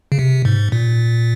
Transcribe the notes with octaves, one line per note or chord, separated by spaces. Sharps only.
C#3
C3
G#2
A#2